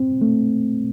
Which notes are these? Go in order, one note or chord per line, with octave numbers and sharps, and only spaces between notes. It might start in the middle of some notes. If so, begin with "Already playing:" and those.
Already playing: C4
A3